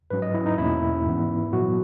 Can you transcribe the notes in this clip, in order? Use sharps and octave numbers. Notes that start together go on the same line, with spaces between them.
G#2 F#3 C#4 B4
D#5
E4
D#4
E2 B2 A#3 C#4 E4
G#2 E3 B3
A#2 F#3 B3 F#4